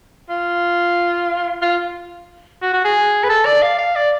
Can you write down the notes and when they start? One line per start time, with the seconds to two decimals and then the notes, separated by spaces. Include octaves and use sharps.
0.29 F4
1.62 F4
2.62 F#4
2.73 F#4
2.85 G#4
3.24 B4
3.29 A4
3.45 D5
3.62 F5
3.79 F5
3.96 D5